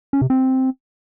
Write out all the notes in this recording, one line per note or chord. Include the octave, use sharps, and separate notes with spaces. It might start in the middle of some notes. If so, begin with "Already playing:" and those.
C#4
C3
C4